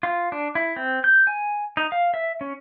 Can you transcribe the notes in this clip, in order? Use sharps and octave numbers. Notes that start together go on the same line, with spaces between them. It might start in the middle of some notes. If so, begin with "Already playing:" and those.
F4
D4
E4
C4
G6
G#5
D#4
F5
E5
C#4